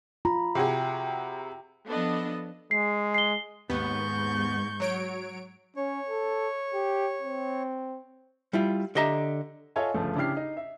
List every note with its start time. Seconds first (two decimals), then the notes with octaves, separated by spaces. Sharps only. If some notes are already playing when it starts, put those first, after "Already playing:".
0.25 F4 A#5 B5
0.55 C3 F#4 G#4 E5 G5
1.88 F3 B3 D4 A4 D#5
2.71 G#3 C7
3.14 C7 G7
3.70 D#2 G#2 B3 C#6 G6
4.80 F#3 C#5 D7
5.76 C#4 C#5
6.09 A4
6.74 G4
7.22 C4
8.53 G3 E4 F4
8.95 D3 G4 D#5 E5 A#5
9.76 F4 A4 C#5 D#5 E5 G#5
9.94 G1 C#2 F3 A3
10.16 C#3 D4 E4 G4 F6 C7
10.37 D#4
10.57 E5